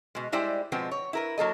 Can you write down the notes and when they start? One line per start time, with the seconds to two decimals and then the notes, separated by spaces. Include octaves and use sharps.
0.15 B2 G#3
0.32 G3 G#3 E4 C5 D5 G5
0.72 B2 F3 G#3 B3 C4
0.91 C#5
1.13 E4 A#4 B4
1.38 F#3 A#3 A4 D#5